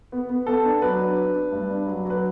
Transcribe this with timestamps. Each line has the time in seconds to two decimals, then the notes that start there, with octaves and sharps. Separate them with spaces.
0.12 B3
0.29 B3
0.47 B3 A4
0.65 D4
0.82 F#3 B4
1.00 D4
1.17 D4
1.35 D4
1.52 G2
1.70 D4
1.87 F#3
2.05 F#3 B4